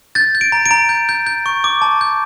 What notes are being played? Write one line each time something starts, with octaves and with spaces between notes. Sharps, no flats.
G6 A6
G6
D7
A#5
D7
A#5
G6
G6
G6
C#6
D6
A5
G6